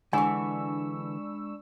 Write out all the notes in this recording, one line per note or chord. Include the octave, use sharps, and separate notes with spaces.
D3 E3 G#3 D4 G#5 B5 C#6 E6